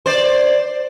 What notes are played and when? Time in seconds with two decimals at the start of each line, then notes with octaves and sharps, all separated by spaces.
0.06 C5 D5